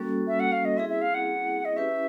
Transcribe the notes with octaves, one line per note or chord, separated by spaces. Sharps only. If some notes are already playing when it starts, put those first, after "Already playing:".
Already playing: G3 A#3 C#4 F#4 A4
E5
F#5
F5
D#5
C4 E4 G#4 E5
E5
F5
F#5
D#5
C#4 E4 G4 B4 E5